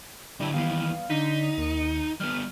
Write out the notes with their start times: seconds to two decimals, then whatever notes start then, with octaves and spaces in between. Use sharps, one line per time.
0.40 D3 G3 E4 A4
0.54 D#2 E3 G3 B3 F5
1.10 D3 D#4 B6
1.57 D#2 C#7
2.20 G3 B3 F6